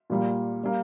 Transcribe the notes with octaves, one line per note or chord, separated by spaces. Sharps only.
A#2 G3 A#3
G3 A#3